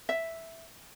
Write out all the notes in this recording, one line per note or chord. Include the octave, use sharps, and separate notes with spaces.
E5